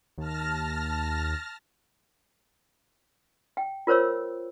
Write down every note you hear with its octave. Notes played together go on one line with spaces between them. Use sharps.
D#2 A5 F6 A#6
G5
F4 A#4 C5 C#5 E6